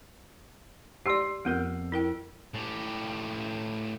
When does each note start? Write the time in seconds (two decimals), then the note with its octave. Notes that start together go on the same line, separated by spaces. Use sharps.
1.06 G4 D5 C6 E6 C7
1.45 F2 B3 C4 A#4
1.92 E4 A#4 G5
2.55 A2 G4